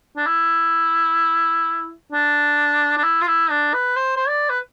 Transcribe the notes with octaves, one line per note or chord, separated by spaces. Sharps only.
D4
E4
D4
D4
E4
F4
E4
D4
B4
C5
C5
D5
B4